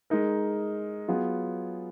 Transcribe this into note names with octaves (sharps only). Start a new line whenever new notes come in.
G#3 D#4 A#4
F#3 B3 F4 G#4